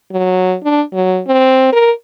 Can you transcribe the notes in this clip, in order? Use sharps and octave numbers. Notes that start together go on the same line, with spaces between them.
F#3
D4
F#3
C4
A#4